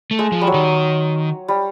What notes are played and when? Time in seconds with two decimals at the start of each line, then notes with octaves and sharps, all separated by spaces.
0.11 A3
0.19 G#3
0.32 F3
0.41 G3
0.47 F#3
0.54 D#3
1.48 G3